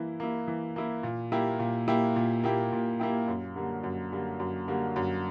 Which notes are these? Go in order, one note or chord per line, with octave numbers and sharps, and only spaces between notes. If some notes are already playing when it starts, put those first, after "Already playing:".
Already playing: E3 A#3 E4
A#3 E4
E3
A#3 E4
A#2
A#3 E4 G4
A#2
A#3 E4 G4
A#2
A#3 E4 G4
A#2
A#3 E4 G4
F#2
D3 G3 A#3
F#2
D3 G3 A#3
F#2
D3 G3 A#3
F#2